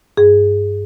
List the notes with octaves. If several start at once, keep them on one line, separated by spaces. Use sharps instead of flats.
G2 G#4